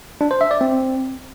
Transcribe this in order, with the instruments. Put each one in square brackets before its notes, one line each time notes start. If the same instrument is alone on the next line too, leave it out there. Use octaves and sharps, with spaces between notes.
[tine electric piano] D4
C5
E5
D5
C4